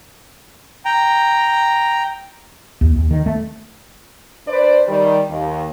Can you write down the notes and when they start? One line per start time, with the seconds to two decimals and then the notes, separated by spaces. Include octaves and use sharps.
0.85 G5 A#5
2.81 D#2
2.96 D#2
3.11 D#3
3.26 A3
4.47 D4 B4 C5 D5
4.88 D#3 G3
5.30 D#2